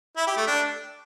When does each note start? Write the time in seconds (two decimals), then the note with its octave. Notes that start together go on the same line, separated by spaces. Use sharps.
0.17 E4
0.27 G4
0.37 A3
0.47 D4